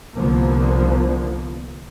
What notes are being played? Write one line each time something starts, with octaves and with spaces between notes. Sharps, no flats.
C2 D3 F3 A#3 B3